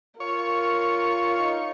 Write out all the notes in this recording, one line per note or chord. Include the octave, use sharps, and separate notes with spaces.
F4 A#4 C#5
D#4